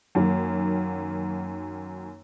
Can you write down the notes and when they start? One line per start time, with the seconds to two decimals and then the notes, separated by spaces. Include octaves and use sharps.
0.15 F#2 D#3 F#3 A#3